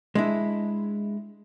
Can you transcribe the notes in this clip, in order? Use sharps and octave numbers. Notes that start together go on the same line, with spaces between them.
G#3 D4 E4